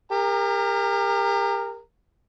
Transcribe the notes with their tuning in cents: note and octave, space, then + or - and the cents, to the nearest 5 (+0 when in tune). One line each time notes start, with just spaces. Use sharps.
G4 +40 A#4 +0 A#5 -20